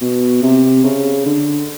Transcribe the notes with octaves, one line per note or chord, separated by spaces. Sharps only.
B2
C3
C#3
D3